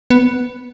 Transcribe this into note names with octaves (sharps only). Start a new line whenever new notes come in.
B3